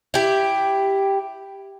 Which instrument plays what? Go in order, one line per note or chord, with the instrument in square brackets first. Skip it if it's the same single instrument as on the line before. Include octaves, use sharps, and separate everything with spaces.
[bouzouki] E4 G4